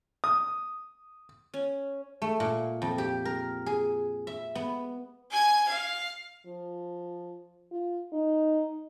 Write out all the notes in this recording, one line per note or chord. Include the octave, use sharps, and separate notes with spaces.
D#6
C#4
A3
A#2
F2
G4
A#4
G#4
E5
B3
G#5 G#6
F5
F3
F4
D#4